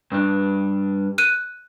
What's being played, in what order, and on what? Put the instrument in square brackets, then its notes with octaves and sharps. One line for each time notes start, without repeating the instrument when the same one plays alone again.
[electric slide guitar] G2 D4
[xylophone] F#6 D#7